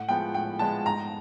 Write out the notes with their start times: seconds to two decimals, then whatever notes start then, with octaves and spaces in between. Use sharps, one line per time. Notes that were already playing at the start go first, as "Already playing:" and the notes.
Already playing: A2 F#5
0.09 F3 G#3 B3 G5
0.34 A2 G5
0.59 F3 G#3 B3 A5
0.85 G#2 A#5